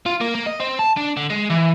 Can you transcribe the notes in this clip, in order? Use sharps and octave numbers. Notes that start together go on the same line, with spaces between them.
F4
A#3
A#3
D#5
C4
A5
D4
D3
G#3
E3